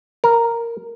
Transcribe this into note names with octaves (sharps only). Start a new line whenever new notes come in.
A#4